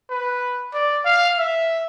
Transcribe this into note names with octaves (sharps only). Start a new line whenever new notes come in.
B4
D5
F5
E5